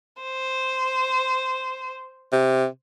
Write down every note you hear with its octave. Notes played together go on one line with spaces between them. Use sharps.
C5
C3